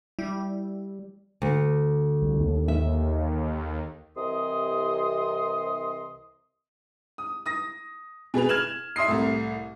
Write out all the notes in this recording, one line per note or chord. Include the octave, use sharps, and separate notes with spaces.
G3 E4
D2
C2
D#2
E5
C2 C3 E3 D#5 C6 D#6
D#6
D#6 A#6
B2 G#4 B4 F7
F6 G#6 E7 F#7
E5 C6 D#6 C7
C2 A2